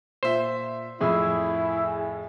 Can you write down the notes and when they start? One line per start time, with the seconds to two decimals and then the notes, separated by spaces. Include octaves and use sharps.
0.23 A#2 C5 E5
1.01 F2 A2 E4 G#4